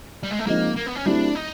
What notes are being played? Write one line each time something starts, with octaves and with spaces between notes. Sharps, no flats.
G3
G#3
A3
F3 G#3 A#3 C4 D#4
A#3
B3
C#4
F#3 A3 C4 D4 E4 G4
D#4